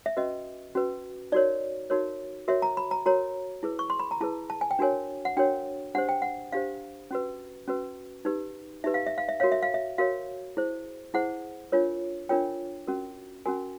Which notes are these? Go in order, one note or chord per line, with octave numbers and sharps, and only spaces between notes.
E5
C#4 F#4 B4 D#5
C#4 F#4 B4
D#4 F#4 A#4 C#5 D5
D#4 F#4 A#4 C#5
F#4 A#4 C#5 E5
A#5
B5
A#5
F#4 A#4 C#5 A#5
E4 G#4 B4
C#6
C6
B5
A#5
E4 G#4 B4 A5
A5
G#5
G5
D4 F#4 A#4 C#5 G#5
F#5
D4 F#4 A#4 C#5 G5
D4 G4 C5 F#5
G5
F#5
D4 G4 C5 F5
C#4 F#4 B4
C#4 F#4 B4
D#4 G4 B4
D#4 G4 B4 E5
F5
E5
F5
E5
F#4 A#4 C#5 F5
E5
F5
E5
F#4 A#4 C#5 F5
E4 G#4 C5
E4 G#4 C5 F#5
D4 F4 A#4 C#5
D4 F4 A#4 C#5 G5
C#4 F#4 A#4
C#4 F#4 A#4 G#5